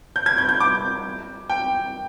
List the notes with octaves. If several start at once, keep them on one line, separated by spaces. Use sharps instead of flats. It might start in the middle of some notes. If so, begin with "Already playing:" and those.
G6
G#6
G6
G6
D6
G5